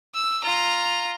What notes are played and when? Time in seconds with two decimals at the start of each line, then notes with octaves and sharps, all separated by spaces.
0.15 E6
0.43 F4 A#5